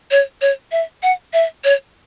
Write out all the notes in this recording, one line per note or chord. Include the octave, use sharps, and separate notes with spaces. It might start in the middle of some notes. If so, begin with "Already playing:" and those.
C#5
C#5
E5
F#5
E5
C#5